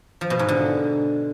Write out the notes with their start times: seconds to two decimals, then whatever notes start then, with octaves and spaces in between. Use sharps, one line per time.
0.21 F3
0.30 B2
0.39 G#2
0.49 D3